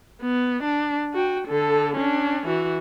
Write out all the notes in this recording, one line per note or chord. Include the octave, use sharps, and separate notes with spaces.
B3
D4
F#4 G5
D3 A4
C#4 D4
E3 F#4